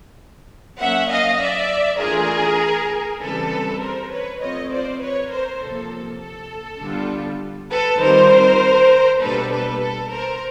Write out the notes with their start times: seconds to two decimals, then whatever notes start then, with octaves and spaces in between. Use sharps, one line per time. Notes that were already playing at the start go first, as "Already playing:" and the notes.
0.81 F#3 A#3 C#4 E5 F#5
1.11 D#5 F5
1.41 D5 E5
2.01 E3 A3 D4 F4 G#4 A#4
3.21 C#3 E3 G3 C4 A4 B4
3.81 A#4 C5
4.11 B4 C#5
4.41 F3 A3 C4 F4 C#5 D#5
4.71 C5 D5
5.01 B4 C#5
5.31 A#4 C5
5.61 C3 F3 A#3 A4
6.22 A4
6.81 D3 G3 B3 D4 F4
7.71 A4 B4
8.01 D#3 G3 C4 F4 A#4 C5
9.21 B2 G3 A#3 D4 A4 B4
9.51 A4 B4
9.80 A4
10.11 A#4 C5